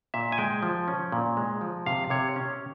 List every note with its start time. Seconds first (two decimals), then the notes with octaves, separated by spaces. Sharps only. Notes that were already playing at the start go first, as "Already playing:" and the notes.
0.14 A#2 E5
0.32 G#5
0.38 G#3 G5
0.63 F3
0.88 C#4
1.12 A#2
1.37 G#3
1.61 F3
1.86 C3 F5
2.10 C3 C#5
2.36 C#4